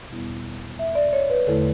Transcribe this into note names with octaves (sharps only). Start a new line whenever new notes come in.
E2 B2 G3 B3 E4
E5
D5
C#5
B4
E2 D3 A3 E4 A4